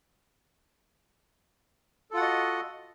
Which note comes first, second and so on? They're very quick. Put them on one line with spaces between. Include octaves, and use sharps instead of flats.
A4 F4 F#5 F#4 D#5